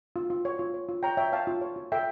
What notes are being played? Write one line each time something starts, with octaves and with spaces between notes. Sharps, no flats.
F4
F4
C#5
F4
C#5
F4
C#5 G5 A#5
C#5 E5 G5
C#5 F5 A5
F4
C#5
F4
A4 E5 G5